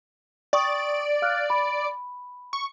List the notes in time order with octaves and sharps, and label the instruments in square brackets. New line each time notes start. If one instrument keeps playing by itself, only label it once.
[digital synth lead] D5 [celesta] G5 C#6 D#6
[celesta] F5 F6 F#6
B5
[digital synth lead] C#6